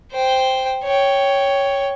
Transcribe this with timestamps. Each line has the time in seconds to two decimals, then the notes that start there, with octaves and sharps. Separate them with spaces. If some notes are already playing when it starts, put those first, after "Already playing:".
0.12 C5 G5
0.84 C#5 G5